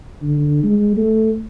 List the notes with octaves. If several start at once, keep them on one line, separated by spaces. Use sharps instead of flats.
D3
G#3
A3